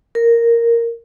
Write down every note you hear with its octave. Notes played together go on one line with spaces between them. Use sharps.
A#4